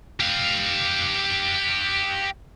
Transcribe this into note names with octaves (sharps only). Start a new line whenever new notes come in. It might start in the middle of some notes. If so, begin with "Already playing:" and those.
G4 F5